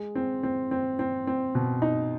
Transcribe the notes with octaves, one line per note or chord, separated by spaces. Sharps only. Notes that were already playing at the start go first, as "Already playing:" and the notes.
Already playing: G#3
C4
C4
C4
C4
C4
B2
D#4